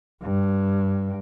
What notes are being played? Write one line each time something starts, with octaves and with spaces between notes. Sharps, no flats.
G2